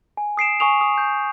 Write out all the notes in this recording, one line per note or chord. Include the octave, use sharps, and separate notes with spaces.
G#5
D#6 C7 D7 E7
G#5 C#6 D#6 F7
D#6
G6